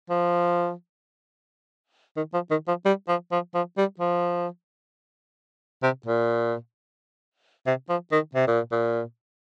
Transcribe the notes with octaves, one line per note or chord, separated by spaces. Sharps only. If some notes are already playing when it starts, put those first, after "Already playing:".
F3
D#3
F3
D#3
F3
G3
F3
F3
F3
G3
F3
C3
A#2
C3
F3
D#3
C3
A#2
A#2